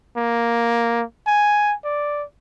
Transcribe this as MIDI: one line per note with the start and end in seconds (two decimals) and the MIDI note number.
0.17 1.04 58
1.27 1.74 80
1.84 2.24 74